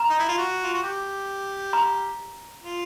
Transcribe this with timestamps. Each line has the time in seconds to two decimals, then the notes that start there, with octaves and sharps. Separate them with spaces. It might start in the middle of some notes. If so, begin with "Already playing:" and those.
Already playing: A#5
0.10 D#4
0.19 E4
0.28 F4
0.37 F#4
0.63 F4
0.73 F#4
0.83 G4
1.73 A#5
2.63 F4